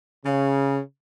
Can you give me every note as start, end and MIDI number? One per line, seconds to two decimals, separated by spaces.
0.24 0.78 49